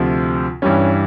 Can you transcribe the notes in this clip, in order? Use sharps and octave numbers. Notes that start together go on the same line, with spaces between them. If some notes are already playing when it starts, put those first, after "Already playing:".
Already playing: D2 C3 F3
G2 E3 G3 C#4